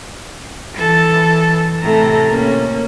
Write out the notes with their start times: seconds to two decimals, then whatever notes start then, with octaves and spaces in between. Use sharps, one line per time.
0.74 E3 A4
1.82 A2 C3 A3 A#5
2.28 A#3 C#4